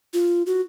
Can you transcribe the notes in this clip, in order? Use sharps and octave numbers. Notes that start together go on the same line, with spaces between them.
F4
F#4